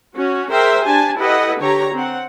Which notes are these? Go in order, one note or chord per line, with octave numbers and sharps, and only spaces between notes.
C#4 F#4
G#4 A#4 C5 E5 G5
D4 G4 G#5 A5
E4 G4 A4 B4 D#5 F#5
D3 G4 C#5 A#5
C4 F#5